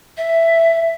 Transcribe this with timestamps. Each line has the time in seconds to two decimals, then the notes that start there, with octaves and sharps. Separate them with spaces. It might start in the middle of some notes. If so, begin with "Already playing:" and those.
0.17 E5